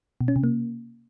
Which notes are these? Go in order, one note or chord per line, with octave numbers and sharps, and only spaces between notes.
B2
C#4
C3
A#3